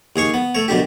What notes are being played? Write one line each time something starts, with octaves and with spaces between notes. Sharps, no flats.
D#2 G#4 C#5 C#6
B3
A3 C#5
F#2 B2 D4 G4